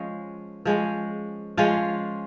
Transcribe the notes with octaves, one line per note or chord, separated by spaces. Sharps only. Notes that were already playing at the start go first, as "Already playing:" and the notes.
Already playing: F3 G#3 C#4 G#4
F3 G#3 C#4
F3 G#3 C#4 F4